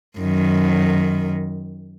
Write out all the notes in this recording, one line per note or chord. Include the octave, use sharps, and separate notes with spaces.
F#2 D#3